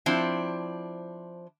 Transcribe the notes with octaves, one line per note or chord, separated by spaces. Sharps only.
F3 C4 D4 E4